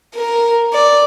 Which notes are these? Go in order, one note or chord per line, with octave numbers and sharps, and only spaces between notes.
A#4
D5